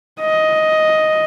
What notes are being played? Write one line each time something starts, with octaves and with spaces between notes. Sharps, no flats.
D#5